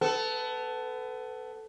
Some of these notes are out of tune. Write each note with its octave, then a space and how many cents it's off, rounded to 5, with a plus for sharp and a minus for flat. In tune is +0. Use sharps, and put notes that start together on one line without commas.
B3 +25 A4 +0